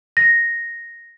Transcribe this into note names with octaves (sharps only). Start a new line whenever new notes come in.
A#6